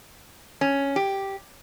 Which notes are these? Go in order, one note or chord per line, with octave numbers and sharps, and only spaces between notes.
C#4
G4